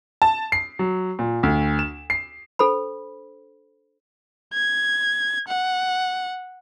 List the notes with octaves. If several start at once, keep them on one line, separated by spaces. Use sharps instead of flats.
A5
C7
F#3
A#2
D2
E7
C7
D4 A4 C5 B5
G#6
F#5